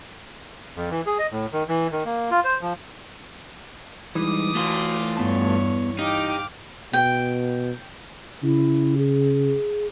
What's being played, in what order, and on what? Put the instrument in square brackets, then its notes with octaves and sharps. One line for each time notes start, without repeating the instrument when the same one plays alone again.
[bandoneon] F2
E3
G#4
D#5
A2
D#3
E3
D#3
A#3
F4
C5
F3
[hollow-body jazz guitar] E3 [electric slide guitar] G3 G#3 D#4 [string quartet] D6 D#6
[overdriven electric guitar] A3 F4 [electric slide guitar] F#4
[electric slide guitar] E2 B3 A5 [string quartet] G2 C#5
[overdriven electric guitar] D#4 [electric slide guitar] G4 [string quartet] F5 G5 D6
[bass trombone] B2 [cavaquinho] G5
[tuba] C#3 [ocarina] E4
[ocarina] G#4